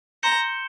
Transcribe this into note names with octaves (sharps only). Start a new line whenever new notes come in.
A#5 C6 G6 C#7 E7 G7